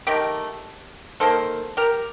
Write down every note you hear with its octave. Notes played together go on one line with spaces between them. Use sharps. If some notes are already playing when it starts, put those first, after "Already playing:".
D#3 A3 G4 A#4
D#3 A#3 A4 C5
G4 A#4